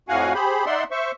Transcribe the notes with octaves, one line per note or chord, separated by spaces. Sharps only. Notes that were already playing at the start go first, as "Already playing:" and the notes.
F2 A2 F#4 F5 F#5 G#5
G4 G#4 C5 B5
D#4 D5 E5 F#5 C6
C5 E5 C#6